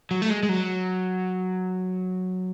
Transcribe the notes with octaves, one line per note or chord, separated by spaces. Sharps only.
F#3
A3
G#3
G#3
F#3